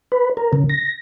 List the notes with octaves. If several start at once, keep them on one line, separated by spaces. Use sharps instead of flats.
B4
A#4
C#3
A#6